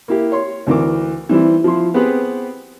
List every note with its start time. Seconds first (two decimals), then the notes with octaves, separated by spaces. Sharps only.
0.08 A#3 E4 G4
0.32 C#5 C6
0.67 D2 E3 A#4 D6
1.29 E3 G3 C4 E4
1.64 F3 E4 C6
1.94 B3 C4 G4 G#4 B4